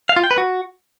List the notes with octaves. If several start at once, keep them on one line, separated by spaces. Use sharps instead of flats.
F5
F4
G5
B4
F#4